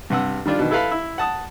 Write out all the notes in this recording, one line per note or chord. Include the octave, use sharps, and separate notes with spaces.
G2 C3 F#5 E6
D#3 G3 D4 F4
B2 D#3
E4 A4 B4 F5 B5
E4
F#5 A5 D#6